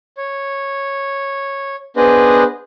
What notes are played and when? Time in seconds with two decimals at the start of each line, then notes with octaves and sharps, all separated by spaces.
0.17 C#5
1.97 B3 D4 G#4 B4 C5 D#5